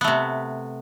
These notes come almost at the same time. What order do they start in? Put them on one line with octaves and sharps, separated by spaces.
B3 A3 C3